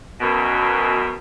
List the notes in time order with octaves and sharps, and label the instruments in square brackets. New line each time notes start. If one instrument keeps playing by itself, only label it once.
[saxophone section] F#2 B2